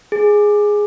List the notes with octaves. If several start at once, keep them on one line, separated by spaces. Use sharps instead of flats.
G#4